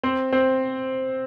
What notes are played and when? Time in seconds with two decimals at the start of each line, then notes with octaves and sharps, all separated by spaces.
0.03 C4 C5
0.32 C4 C5